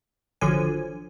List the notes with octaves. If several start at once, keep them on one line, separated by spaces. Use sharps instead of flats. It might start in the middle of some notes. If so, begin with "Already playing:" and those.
G#1 D3 F3 F#3 G#5